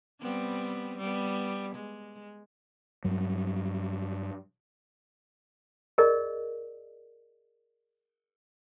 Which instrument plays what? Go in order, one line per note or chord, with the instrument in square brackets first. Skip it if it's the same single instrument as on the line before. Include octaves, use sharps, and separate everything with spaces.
[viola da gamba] G3 B3 C4
G3 B3
G#3
[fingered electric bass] G2 F#3
[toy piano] G#4 A#4 D5 D#5